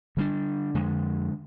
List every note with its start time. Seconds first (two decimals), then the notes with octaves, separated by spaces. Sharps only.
0.17 D3 G3 D4
0.74 F2 D3 G#3